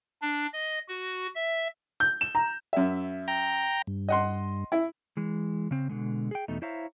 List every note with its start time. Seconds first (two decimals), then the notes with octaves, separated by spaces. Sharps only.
0.22 D4
0.53 D#5
0.89 F#4
1.35 E5
2.00 G6
2.21 E7
2.35 A#5
2.73 F#2 E5
3.28 G5 A#5
3.87 G2
4.08 D#5 F#5 C6
4.72 E4
5.17 E3 G#3
5.71 C#3 C4
5.89 B2 D3 G#3
6.31 G#4 G5
6.48 E2 B2 A3 D#4
6.62 E4 C5 C#5 E5 F5 A#5